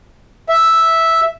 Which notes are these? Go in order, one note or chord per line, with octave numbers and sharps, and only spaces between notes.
E5